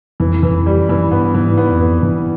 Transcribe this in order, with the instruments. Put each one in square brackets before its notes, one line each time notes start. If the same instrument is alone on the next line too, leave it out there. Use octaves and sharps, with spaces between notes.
[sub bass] F2 [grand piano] E3
[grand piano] E3
[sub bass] F2
[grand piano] G3
[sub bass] F#2
[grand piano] E3
[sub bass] G2 [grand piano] B3
[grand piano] E3
[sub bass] G#2
[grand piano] B3
[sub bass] F2
[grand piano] B3
[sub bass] G2 [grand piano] E3